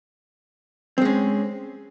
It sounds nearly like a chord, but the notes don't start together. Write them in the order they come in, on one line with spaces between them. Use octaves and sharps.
C4 G#3 C#4